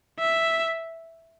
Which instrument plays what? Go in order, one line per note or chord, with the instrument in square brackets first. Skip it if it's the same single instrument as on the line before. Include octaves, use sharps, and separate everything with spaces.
[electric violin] E5